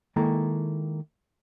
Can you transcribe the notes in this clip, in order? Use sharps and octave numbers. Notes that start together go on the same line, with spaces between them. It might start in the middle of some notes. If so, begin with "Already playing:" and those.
D#3 G#3 A#3 E4 A4 A#5